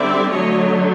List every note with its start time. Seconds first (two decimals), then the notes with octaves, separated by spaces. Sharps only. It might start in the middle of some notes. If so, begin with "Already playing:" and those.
Already playing: D3 G3 C4 D5 E5
0.30 D3 F#3 A3 C#5 D#5